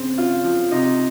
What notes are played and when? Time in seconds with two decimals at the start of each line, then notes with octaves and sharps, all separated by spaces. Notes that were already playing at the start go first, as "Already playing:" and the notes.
Already playing: C#3 C4
0.17 C#3 F4
0.44 F3
0.71 C3 D#4